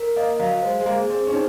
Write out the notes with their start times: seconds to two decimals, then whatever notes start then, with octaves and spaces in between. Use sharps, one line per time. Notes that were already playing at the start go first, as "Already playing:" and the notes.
Already playing: A#4
0.16 A#3 D#5
0.39 F#3 F5
0.63 G#3 C5
0.80 G#3
0.86 A#3 G#4
1.10 C4 G#4
1.27 C#4
1.33 C4 D#4